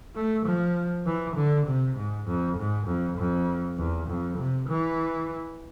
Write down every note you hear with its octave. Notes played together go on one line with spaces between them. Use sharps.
A3
F3
E3
D3
C3
G#2
F2
G#2
F2
F2
E2
F2
C3
E3